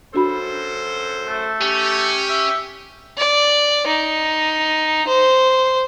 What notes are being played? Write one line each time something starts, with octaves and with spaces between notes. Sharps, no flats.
F#2 D4 F#4 A4 C5 B5
A3
C#4 G4
E5
D5
D#4
C5